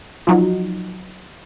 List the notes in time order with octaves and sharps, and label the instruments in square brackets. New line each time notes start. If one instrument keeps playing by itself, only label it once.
[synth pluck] F3 F#3 D#4